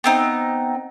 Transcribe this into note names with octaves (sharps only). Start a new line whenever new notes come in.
B3 C4 D#4